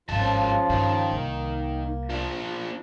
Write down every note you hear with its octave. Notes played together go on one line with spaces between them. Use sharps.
G#1 G2 C#3 F3 G#3 F4 A5
G2 D#3
C2 A#3
F3 D4